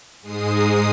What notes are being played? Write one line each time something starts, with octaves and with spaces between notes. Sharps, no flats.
G#2 G#3 D#6 C7